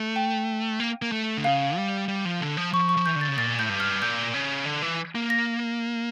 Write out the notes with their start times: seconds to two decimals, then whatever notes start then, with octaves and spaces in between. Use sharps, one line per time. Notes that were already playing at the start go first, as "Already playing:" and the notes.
Already playing: A3
0.16 G5
0.80 A#3
1.02 A#3
1.12 A3
1.37 D3
1.44 C#3 F5
1.77 G3
2.08 G3
2.25 F3
2.40 D3
2.57 F3
2.73 F3 C#6
2.89 C#6
2.97 F3
3.06 E3 G6
3.15 D3
3.21 A6
3.28 C#3
3.37 A#2 A6
3.59 A2 G6
3.69 G2
3.80 F6
4.02 A#2 G6
4.34 C#3
4.66 D3
4.82 E3
5.15 A#3
5.30 A#6